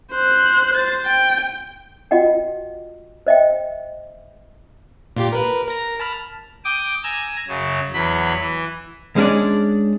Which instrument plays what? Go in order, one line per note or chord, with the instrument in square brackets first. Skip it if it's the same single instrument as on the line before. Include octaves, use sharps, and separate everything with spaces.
[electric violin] C5 F#6
C5 A6
G5
[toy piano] F4 F#4 D#5 F#5 G5
C5 D#5 E5 G5
[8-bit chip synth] A#2 F4 G4
A#4 B4
A#4 A#6
A5 B5 F6
[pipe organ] G5 D6 D#6
G#5 A#5 E6
F#2 C#3
E2 F#3 B5
E3
[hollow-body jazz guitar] G#3 C#4 D4 D5